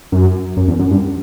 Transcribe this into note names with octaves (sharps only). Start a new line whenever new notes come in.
F#2
F#2
E2
F#2
G2